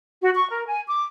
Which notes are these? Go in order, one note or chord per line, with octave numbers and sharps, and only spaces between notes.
F#4
C#6
A#4
G#5
D6